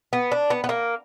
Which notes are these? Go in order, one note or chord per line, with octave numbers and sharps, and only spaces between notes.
B3
D4
B3
B3
A#3